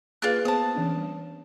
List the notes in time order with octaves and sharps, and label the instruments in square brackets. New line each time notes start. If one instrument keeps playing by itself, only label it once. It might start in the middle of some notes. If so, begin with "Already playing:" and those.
[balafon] A#3 G#4 B4 [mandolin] F4 D5 F#6
[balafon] B3 C5 [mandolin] A5 D#6
[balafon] E3 C#4 D4
G3